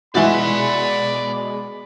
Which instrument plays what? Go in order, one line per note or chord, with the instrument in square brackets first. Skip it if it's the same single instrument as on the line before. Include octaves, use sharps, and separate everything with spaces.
[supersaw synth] B2 G#3 [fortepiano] E3 E4 F#4 [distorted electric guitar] D5 C6 [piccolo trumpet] B5